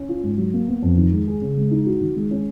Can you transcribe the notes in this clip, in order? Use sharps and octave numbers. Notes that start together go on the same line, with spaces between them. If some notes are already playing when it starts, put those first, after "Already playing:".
Already playing: C#4
F4
G#2
F#3
A#3
B3
F2
D#3
G#3
G#4
C#3
G#3
D#4
F#4
D#3
G#3
C#4